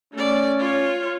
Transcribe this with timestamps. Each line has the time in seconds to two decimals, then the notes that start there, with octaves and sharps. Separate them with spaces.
0.13 A3 C#4 D5
0.59 F4 C#5